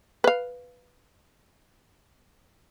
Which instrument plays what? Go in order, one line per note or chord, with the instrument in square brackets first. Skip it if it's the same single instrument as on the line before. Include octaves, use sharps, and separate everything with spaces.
[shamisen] B4 F5